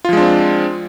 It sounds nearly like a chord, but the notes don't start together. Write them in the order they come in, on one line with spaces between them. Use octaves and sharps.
F4 F3 G#3 D4 C4